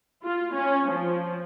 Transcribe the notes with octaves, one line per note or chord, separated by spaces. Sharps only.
F4
C#4
F3